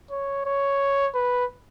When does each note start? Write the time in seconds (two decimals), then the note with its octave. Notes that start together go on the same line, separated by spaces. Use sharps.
0.11 C#5
0.46 C#5
1.14 B4